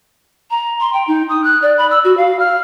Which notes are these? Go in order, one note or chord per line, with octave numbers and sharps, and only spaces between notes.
A#5
C6
G5
D#4
D#6
F#6
D5
B5
E6
F#4
F5
F6